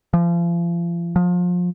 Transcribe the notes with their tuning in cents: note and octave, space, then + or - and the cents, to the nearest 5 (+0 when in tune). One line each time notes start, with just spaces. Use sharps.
F3 -35
F3 +30